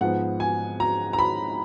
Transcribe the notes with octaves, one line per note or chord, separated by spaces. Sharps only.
G#2 F3 B3 F#5
G#5
A#5
A#5
B5